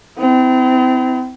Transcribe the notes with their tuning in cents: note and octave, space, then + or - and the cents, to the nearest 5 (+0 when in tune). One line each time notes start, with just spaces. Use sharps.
C4 -35 E4 -25